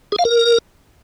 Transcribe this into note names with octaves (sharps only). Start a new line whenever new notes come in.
G#4
F5
A#4